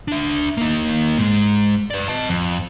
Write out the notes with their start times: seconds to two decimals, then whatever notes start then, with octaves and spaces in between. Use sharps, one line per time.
0.08 D4 E5
0.58 A#3 D#4
1.18 G#2 G#3
1.90 B4 D5
2.08 D#5 A5
2.29 F2